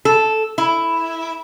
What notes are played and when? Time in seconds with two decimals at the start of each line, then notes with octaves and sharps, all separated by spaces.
0.05 A4
0.58 E4